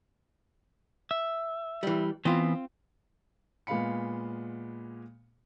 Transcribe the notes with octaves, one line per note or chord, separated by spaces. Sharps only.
E5
E3 G3
E3 B3 C4 F4
A#2 G#3 B3 F5 B5 C#7